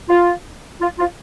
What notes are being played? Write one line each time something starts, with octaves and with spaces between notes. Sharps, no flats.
F4
F4
F4